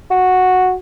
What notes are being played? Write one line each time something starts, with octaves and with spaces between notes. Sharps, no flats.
F#4